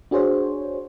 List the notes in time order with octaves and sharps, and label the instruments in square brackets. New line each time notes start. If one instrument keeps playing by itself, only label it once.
[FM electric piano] D4 F#4 G#4 C5 C#5